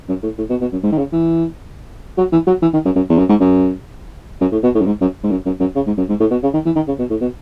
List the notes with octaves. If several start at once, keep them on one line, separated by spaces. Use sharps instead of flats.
F#2
A2
A2
B2
B2
F#2
G#2
D#3
C#3
E3
F#3
E3
F#3
E3
D#3
F#2
F#2
E2
F#2
G#2
F#2
F#2
A2
B2
A2
F#2
G#2
F#2
G#2
F#2
F#2
F#2
C#3
G#2
F#2
G#2
A2
B2
C#3
D#3
E3
D#3
C#3
B2
A2
B2